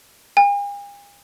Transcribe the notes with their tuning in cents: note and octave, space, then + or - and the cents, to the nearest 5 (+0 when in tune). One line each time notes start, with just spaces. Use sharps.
G#5 -45